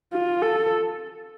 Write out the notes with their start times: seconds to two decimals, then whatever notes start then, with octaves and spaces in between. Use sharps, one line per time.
0.13 F4
0.42 A4